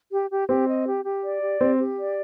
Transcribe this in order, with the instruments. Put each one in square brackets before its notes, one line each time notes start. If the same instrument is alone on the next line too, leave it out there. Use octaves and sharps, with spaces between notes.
[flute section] G4
G4
[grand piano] C4 [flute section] G4
[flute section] D#5
G4
G4
D5
G4
[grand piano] C4 [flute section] G4
[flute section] G4
D5